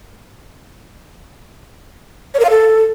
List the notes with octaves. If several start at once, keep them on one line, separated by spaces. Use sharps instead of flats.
C#5
A#4
F5
A4